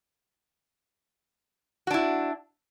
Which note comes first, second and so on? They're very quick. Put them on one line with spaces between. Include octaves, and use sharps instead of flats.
F#4 D4 E4